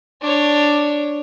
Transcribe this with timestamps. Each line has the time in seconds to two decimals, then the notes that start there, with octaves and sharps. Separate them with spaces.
0.22 D4 C#5